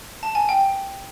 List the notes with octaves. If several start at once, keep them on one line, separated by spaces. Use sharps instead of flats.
A5
G#5
G5